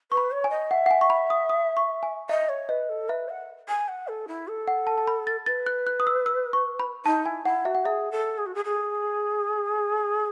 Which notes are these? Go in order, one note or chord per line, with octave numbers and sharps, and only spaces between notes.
B4 C#6
B5
C#5
G#5
D#5
E5 F#5
F#5
G#5
C#6
B5
D#6
D#6
C#6
G#5
D#5 E5
C#5
B4 D#5
A4
B4 E5
F#5
G#5
F#5
A4
E4
A4
F#5
A5
A5
B5
A6
B4 A6
F#6
F#6
D#6
E6
E6
C#6
B5
D#4 A5
E4 G#5
E4 F#5
F#4 E5
F#5
G#4 E5
A4
G#4
F#4
G#4
G#4